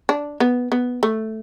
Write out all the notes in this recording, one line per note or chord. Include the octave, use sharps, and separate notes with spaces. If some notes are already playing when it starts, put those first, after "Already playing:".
D4
B3
B3
A3